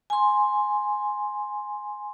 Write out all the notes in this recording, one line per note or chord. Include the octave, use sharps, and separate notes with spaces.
G#5 C6